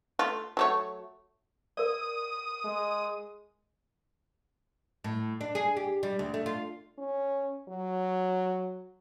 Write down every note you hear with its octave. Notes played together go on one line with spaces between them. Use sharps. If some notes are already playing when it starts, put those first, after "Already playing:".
A3 F4
F#3 A3 C#5
A#4 D5 D#6
G#3
A2
D4
G#4
G4
G3
D2
A3
F4
C#4
F#3